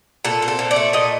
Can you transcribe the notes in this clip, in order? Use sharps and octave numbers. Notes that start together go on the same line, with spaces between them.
A#2 A4
C4
A4
A#2
D5
A3
A#2 D#5